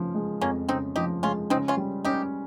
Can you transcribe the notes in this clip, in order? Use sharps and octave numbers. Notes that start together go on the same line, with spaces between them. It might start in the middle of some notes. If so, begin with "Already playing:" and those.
Already playing: C#3 F3
G#3
F2 A#3 C#4
C#3 C4 D#4
F3 D#4 G4
G#3 C#4 F4
C#3 C4 D#4
C#4 F4
G3
C#4 D#4 G4